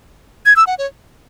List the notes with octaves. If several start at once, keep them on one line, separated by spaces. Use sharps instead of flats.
G#6
E6
F#5
C#5